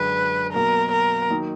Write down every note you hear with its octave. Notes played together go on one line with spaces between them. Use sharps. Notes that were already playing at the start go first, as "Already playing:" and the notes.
Already playing: F#2 D3 G#3 D4 B4
B2 F#3 A#3 A#4
A#4
D#3 F#3 A#3 D#4